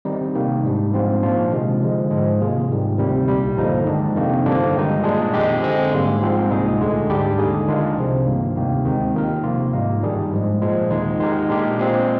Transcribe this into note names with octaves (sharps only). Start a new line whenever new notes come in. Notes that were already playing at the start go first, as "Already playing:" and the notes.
D#3 G3 C4 D#4
C3 D#3 A#3
G#2 G3 D4
G#2 F3 C4 F4
A#2 F3 A#3 D4 F4
C3 D#3 G#3
D3 F3 G#3
G#2 F3 G#3
C3 D#3 A#3 F4 G#4
G#2 D#3 G3
D2 C3 D#3 G3 C4
C2 A#2 G3
G2 D3 F3 A#3 D#4
D#3 G#3 D4
F2 C3 D#3 A#3
G2 D3 F3 A#3 D4
G2 D#3 G#3 D#4
A#2 G#3 D4 G#4
F2 D#3 G#3 D#4 G4
D3 G#3 C4
G#2 G3 A#3
G#2 F3 C4 F4
C2 A#2 G#3 D#4 G#4
D2 D3 G#3
G#2 G3 D4 G4
D#2 D3 G#3 D#4 G#4
D#3 G#3 D4 F4 A#4
C2 C3 F3 C4
G2 D#3 A#3
D2 C3 D#3 A#3 D#4
D#2 D#3 G#3 C4 D#4
D#2 D#3 A#3 F4 A#4
C3 F3 A#3 F4
G#2 G3 A#3 D#4
G2 D#3 G3 D4 G#4
G#2 F3 G#3
A#2 F3 G#3
D#2 D#3 G#3 D#4
D#3 G#3 D#4 G4 A#4
A#2 G#3 D4 G4 A#4
A#2 G#3 C4 F4 G#4